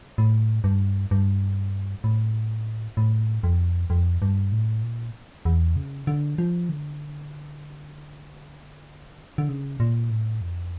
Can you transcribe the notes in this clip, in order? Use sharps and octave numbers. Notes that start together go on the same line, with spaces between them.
A2
G2
G2
A2
A2
F2
F2
G2
A2
A#2
E2
C#3
D3
F3
D3
D3
C#3
A#2
A2
F2